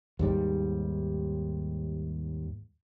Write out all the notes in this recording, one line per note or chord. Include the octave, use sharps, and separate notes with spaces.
D#2 G#2 G3